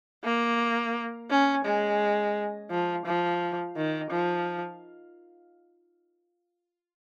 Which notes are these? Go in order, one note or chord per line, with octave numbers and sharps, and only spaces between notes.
A#3
C#4
G#3
F3
F3
D#3
F3